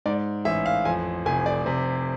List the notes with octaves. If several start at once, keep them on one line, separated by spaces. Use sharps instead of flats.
G#2 D5
A1 E5
F5
F2 G#5
F1 G#5
D5
C3